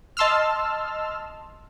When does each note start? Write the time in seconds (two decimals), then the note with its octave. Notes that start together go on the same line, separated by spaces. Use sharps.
0.17 D#5 A5 C6 E6 F6